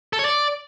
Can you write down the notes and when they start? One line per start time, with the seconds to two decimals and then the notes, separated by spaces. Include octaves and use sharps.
0.13 A4
0.19 C#5
0.25 D5